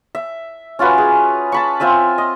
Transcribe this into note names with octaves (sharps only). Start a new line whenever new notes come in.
E5
C#4 F4 F#4 B4
G#4
A5 B5 C#6
C4 F4 E5 G#5
D#5